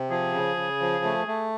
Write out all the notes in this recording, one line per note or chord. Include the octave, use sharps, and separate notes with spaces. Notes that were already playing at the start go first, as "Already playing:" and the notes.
Already playing: C3
F3 G#4
C#3
C#3
F3
A3
A3